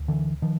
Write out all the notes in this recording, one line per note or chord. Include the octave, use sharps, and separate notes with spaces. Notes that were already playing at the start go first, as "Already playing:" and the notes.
Already playing: D2
D3 E3
D#3 F3